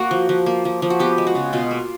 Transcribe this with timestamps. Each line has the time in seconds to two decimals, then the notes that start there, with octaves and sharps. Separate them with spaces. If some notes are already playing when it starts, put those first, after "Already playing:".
Already playing: A#3 F#4
0.11 F3
0.29 F3
0.46 A#3
0.65 F3
0.82 F3
0.90 F#4
1.00 B3 G4
1.18 G#3
1.27 F#4
1.35 C#3
1.53 B2 F4
1.71 A#3